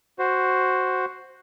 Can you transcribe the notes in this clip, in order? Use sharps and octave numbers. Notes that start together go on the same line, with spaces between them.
F#4 C5